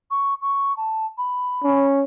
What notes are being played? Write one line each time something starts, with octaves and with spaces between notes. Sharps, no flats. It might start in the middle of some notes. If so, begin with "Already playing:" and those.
C#6
C#6
A5
B5
C#4